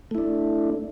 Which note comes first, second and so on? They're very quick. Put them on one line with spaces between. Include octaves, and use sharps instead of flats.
A3 E4 D4